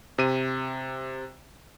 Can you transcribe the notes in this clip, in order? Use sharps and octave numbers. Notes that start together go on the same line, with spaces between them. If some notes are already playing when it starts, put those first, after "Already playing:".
C3 D#7